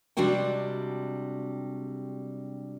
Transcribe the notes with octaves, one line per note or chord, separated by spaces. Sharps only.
C3 G3 G#3 D4 F#4 G5